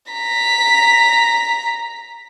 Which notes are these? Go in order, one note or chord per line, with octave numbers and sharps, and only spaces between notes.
A#5 B6